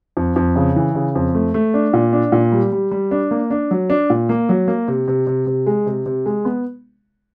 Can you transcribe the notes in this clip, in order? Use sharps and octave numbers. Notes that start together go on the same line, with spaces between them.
F2
F2
C#3
E3
C#3
F2
A3
A3
D4
A#2
D4
A#2
G3
G3
G3
D4
A#3
D4
F#3
D4
A#2
A#3
F#3
A#3
C3
C3
C3
C3
G#3
C3
C3
G#3
B3